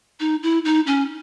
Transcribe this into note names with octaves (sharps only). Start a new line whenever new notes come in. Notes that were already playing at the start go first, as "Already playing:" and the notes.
D#4
E4
D#4
C#4